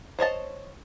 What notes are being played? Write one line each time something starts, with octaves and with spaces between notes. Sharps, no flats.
C5 C#5 D#5 A5